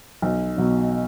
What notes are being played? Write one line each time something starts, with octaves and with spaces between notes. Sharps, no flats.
B1
B2 F#3